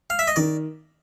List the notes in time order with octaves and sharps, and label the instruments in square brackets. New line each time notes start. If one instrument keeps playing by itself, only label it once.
[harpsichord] F5
E5
D#5
[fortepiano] D#3 [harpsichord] D5